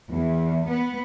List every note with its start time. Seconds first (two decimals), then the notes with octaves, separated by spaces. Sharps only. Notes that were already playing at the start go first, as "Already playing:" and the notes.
0.11 E2
0.68 B3